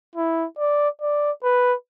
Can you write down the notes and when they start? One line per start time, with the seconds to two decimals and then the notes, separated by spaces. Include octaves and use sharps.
0.16 E4
0.58 D5
1.01 D5
1.44 B4